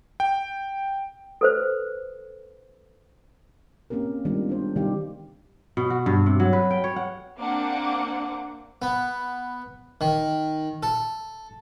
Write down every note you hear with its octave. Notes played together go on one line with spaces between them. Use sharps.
G5
A4 B4 C5
A#3 C4 C#4 G4 A#4
D#3 G3 G#3 B3 D4 F4
D4 C5
C3 D#3 G3 D#4 G4 F5
B2
F#4
G2
C3
F#3
B4
G5
C#5
F#5
A#3 C4 D4 F#5 D6
B3
D#3
A4